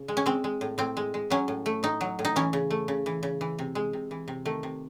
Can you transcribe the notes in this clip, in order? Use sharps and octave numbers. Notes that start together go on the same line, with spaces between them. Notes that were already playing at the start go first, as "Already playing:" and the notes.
Already playing: C#3
G#3
C#4
G#3 C4
G#3
A2
A2 C4
G#3
G#3
F#3 C#4
A2
A3
A2 D#4
F#3
A2
D#4
E3 C#4
C#3
A3
C#3
E3
C#3
E3
C3
G#3
C3
E3
C3
D#3 A3
C3